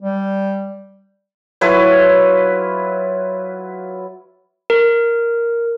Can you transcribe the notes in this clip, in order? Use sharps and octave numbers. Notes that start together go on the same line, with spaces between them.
G3
F#3 E4 F4 B4
A#4